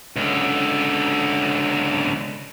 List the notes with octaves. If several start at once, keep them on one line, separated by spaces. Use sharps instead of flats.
C#2 D3